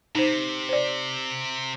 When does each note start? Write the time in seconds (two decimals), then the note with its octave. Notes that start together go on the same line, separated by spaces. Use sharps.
0.15 C3 D#4 C5
0.69 C5 D5